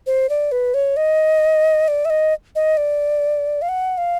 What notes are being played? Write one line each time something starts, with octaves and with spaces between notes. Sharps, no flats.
C5
D5
B4
C#5
D#5
D5
E5
D#5
D#5
D5
F5
F#5
F5